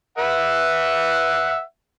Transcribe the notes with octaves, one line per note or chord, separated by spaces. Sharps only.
B4 E5 F#5